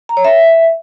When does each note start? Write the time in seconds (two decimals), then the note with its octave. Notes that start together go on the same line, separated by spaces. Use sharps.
0.09 A#5
0.17 C#5
0.24 E5